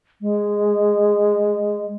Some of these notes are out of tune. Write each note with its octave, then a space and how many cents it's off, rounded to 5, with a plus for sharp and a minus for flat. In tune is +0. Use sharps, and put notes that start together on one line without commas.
G#3 -10